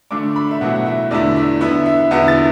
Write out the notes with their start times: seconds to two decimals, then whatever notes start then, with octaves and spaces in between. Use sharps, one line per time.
0.11 D3 A3 D4 D6
0.36 B5
0.51 E5
0.61 B2 F#3 A3 E4 F#5
0.75 F#5
0.86 E5
1.11 E2 D3 A3 E4 D5
1.36 E5
1.61 D3 B3 E4 E5
1.86 E5
2.11 E2 D3 B3 E4 F#5
2.28 A6